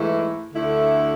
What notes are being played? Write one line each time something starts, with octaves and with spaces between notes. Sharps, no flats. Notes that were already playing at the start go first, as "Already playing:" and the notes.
Already playing: G#2 E3 A3 E4
D2 D3 A3 E4